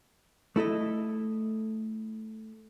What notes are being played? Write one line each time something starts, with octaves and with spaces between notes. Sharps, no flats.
A3 E4 A4 D#5